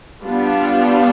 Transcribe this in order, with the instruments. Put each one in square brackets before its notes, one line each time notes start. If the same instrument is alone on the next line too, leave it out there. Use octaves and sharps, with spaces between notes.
[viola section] G3 B3 D4 F4